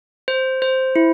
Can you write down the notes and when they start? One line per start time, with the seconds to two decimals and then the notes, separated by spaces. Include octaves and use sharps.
0.28 C5
0.62 C5
0.96 E4